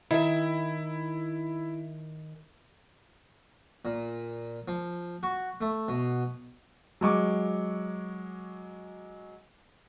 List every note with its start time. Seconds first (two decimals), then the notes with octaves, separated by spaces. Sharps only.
0.11 D#3 E4 E5
3.85 A#2
4.68 F3
5.23 F#4
5.61 A3
5.88 B2
7.01 F#3 G#3 C#6 D6